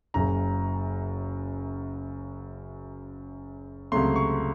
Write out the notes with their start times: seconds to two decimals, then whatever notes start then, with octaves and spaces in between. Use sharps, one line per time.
0.14 F#1 F#2 C#3 A#5
3.92 C#2 C3 F#3 A3 C6
4.16 C#6